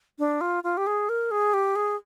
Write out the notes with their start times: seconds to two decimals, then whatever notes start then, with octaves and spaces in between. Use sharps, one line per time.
0.19 D4
0.41 F4
0.64 F4
0.77 G4
0.87 G#4
1.09 A#4
1.31 G#4
1.53 G4
1.75 G#4